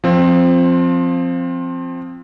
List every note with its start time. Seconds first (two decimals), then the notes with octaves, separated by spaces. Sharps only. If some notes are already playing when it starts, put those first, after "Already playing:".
0.04 F3 C4